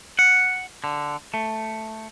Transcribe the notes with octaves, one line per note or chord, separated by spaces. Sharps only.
F#5
D3
A3